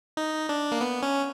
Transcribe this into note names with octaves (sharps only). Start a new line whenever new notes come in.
D#4
D4
A#3
B3
C#4